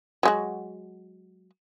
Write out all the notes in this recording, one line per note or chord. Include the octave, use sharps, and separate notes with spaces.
F#3 G#3 F#4